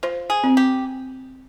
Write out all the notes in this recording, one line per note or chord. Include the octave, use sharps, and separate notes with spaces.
F4 C5
G#4
C4
G4